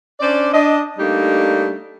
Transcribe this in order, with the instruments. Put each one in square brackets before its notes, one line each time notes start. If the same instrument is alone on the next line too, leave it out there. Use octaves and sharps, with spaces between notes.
[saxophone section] C#4 D4 C5 D5
D4 D#5
G3 A3 A#3 D4 D#4 G4